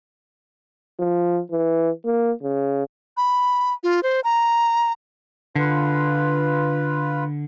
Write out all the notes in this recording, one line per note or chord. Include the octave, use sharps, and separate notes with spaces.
F3
E3
A#3
C#3
B5
F4
C5
A#5
D3 F4 B4